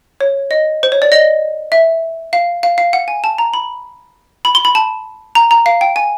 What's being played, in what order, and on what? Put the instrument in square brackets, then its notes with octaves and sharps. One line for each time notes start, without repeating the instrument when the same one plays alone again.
[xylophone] C#5
D#5
C5
C#5
D5
D#5
E5
F5
F5
F5
F#5
G#5
A5
A#5
B5
B5
C6
B5
A5
A#5
A#5
F5
G5
G#5